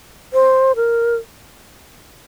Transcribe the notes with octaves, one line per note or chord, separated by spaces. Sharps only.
C5
A#4